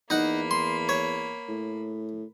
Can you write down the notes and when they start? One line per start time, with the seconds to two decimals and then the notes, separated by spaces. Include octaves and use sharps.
0.10 E2 A#3 D#4 F#5 B5
0.51 C6
0.89 C#5
1.48 A2